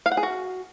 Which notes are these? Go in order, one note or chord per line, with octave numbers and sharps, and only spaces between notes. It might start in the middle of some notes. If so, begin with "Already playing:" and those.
F5
F#5
G#4
F#4